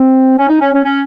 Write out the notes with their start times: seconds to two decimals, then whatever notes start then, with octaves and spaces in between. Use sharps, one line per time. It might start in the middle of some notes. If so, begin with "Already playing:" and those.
Already playing: C4
0.38 C#4
0.49 D#4
0.60 C#4
0.73 C#4
0.84 C#4